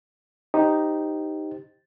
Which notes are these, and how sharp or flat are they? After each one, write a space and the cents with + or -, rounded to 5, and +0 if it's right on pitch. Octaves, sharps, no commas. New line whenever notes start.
D#4 +0 G4 +0 C5 +0